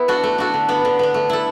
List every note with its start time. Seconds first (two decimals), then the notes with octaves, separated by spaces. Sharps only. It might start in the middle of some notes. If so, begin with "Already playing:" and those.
Already playing: B3 E4
0.08 D4 F#4 A4
0.24 A3
0.38 D4 F#4 A4
0.54 D3
0.69 B3 D4
0.85 D3
0.99 B3 D4
1.14 A3
1.30 E4 A4